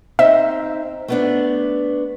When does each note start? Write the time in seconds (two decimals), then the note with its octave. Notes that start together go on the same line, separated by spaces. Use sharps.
0.19 C4 D#4 E5
1.08 A3 B3 D4